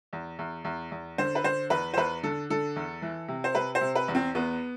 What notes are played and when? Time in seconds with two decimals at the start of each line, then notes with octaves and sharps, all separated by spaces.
0.13 E2
0.39 E2
0.64 E2
0.91 E2
1.18 D3 C5
1.35 B4
1.44 D3 C5
1.70 E2 B4
1.94 C5
1.97 E2 B4
2.23 D3 A4
2.50 D3 A4
2.76 E2
3.02 E3
3.28 C3
3.44 C5
3.55 C3 B4
3.75 C5
3.81 C3
3.95 B4
4.08 E2
4.15 C4
4.35 E2 B3